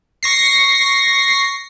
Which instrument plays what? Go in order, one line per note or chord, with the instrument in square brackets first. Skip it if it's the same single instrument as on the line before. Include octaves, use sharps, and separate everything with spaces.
[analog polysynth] C#6 A#6 C7